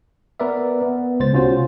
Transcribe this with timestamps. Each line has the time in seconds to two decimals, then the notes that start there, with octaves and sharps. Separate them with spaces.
0.40 B3 A#4 B4 D5 E5
0.82 B3
1.20 C#2 C5 A6
1.33 C3 C#4 F4 F#4 C5